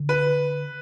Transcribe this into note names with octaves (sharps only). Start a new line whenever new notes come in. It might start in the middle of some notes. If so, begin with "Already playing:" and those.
Already playing: D3
B4